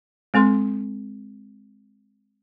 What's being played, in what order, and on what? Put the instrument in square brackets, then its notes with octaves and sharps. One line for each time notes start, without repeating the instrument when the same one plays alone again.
[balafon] G#3 C4 A4 C6